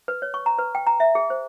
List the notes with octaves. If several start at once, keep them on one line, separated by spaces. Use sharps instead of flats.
B4
C#5
C#6
A#5
B4
G5
A#5
E5
G#4
C5